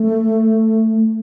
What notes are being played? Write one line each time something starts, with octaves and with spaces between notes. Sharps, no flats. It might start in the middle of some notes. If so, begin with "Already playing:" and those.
Already playing: A3